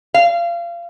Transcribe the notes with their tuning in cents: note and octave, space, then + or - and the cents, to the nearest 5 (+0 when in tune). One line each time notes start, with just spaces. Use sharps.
F5 -30